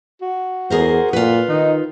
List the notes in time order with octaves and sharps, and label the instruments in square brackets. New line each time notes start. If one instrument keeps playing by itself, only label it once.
[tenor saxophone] F#4
[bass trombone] E2 [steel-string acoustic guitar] G#4 A#4 C5
[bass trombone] A#2 [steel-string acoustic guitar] F4 B4
[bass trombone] D#3 [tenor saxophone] D#4